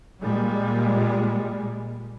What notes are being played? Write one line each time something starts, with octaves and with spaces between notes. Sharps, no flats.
A#2 G3 G#3